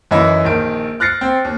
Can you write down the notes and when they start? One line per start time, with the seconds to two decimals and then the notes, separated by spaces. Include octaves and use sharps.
0.11 F#2 E3 D#4 E4
0.44 A#1 D#3 D7
1.00 F6 F#6 A6 A#6 C7 C#7
1.21 C4
1.45 D#2